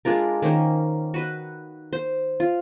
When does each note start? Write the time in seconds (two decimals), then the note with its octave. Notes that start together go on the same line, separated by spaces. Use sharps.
0.05 G#3 D4 F4 A#4
0.42 D#3 A#3 C#4 C5
1.14 F#4 B4 D#5
1.93 C5
2.40 F4